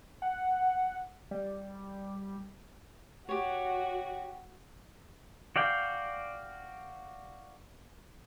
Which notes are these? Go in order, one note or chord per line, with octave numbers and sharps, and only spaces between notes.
F#5
G3
F#4 G4 C#5
F#4 D5 F5 G5